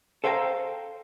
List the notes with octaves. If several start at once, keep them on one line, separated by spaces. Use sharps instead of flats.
A4 C5 F5 G5 G#5 A#5